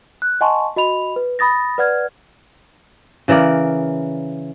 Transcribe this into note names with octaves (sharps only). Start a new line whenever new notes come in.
F#6
D#5 F#5 G#5 A5 C6 C#6
F#4 D#5 B5 F7
B4
B5 D#6 A6 A#6
B4 D5 F#5 F6 G#6
C#3 E3 A#4 D5